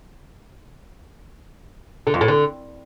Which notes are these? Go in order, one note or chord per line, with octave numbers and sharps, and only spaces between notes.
D3
F2
A2
D3